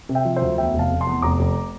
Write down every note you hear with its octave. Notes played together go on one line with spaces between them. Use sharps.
C3
E5 G5
F3
C5 E5
D2
E2 E5 G5
F1
F5 A5
F1
A5 C6
E2
F1 A#5 D6
F1